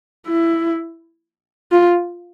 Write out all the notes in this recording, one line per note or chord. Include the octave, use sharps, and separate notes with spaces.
E4
F4